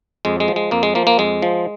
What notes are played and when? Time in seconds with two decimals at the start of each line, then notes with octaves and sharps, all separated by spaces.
0.25 F2 G#3
0.40 G#3
0.48 F3
0.56 G#3
0.71 F2 A#3
0.83 G#3
0.95 F3 A#3
1.07 A#3
1.19 F2 G#3
1.42 F3